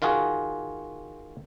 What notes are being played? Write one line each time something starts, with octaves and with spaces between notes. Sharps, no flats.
D#3 F4 F#4 G#4